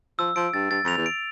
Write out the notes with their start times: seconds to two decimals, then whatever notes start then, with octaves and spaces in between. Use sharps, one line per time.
0.19 F3 E6
0.36 F3 D7
0.53 G2 A6
0.70 G2 A6
0.84 F2 F7
0.97 E2
1.06 D7